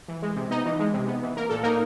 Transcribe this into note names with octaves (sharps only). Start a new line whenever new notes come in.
E3
G#3
C3
B3 D#4 D#5
E3
G#3
C3
B3
E3
A#3 A#4
A#2 A4
A#3 D#4 A#4